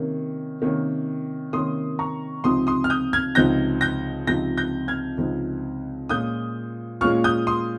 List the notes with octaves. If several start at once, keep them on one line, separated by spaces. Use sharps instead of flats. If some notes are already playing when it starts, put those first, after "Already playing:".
Already playing: C3 D#3 A#3 C#4
C3 D#3 A#3 C#4
C3 D#3 A#3 C#4 C6 D#6
A#5 C#6
C#2 C3 F3 C4 D#4 C6 D#6
C6 D#6
F6
D#6 G6
F6 G#6
C#2 C3 F3 C4 D#4 G6 A#6
G6 A#6
C#2 C3 F3 C4 D#4 G6 A#6
G6 A#6
F6 G#6
C#2 C3 F3 C4 D#4
A#2 G#3 C#4 F4 D#6 G6
A#2 G#3 C#4 F4 C#6 F6
D#6 G6
C6 D#6